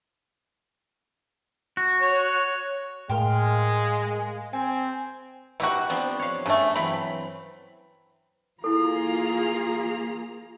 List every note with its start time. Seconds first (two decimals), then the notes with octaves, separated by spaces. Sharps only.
1.77 F#4
2.01 C#5
3.09 A2 G#3 A#4 F5 G5 C6 F6
4.53 C4 G#5
5.60 B2 E4 F#4 G4 A#4
5.90 F3 B3 C4 D4
6.19 C#5 F5
6.46 G2 C#3 G3 A3
6.76 E3 F#3 C4 B5
8.64 A#3 E4 F4 G#4 A4 A#5